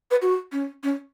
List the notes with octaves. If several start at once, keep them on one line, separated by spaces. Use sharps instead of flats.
B4
F#4
C#4
C#4